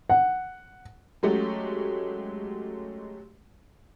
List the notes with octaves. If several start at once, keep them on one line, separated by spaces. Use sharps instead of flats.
F#5
F#3 G#3 A3 C#4 F#4 G4